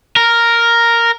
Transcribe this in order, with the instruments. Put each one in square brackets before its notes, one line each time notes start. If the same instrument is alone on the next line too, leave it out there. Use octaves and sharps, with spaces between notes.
[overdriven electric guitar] A#4